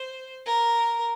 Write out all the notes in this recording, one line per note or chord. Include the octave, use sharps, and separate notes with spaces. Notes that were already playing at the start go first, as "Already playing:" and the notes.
Already playing: C5
A#4